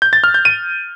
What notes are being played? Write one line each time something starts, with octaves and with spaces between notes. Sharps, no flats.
G6
A6
F6
G6
D#7